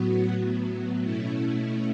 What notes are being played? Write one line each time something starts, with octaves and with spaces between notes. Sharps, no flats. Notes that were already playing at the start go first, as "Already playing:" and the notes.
Already playing: A2 F#3 B3 F#4
A2 F#3 B3
B2 A3 C#4 E4